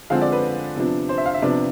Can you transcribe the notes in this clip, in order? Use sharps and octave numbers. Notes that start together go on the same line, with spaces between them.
D3 F3 G#3 C4 F5
D5
B4
C3 F3 B3 D4
C5
E5
F5
E5
C3 F3 B3 D4 D5